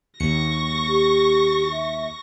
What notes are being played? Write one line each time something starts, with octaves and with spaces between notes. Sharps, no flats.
D#2 C#6 A#6 C#7
G4
E5